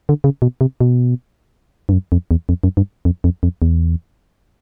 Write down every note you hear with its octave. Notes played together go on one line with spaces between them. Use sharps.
D3
C#3
B2
C3
B2
G2
F#2
F2
E2
F2
F#2
G2
F2
F2
F2
E2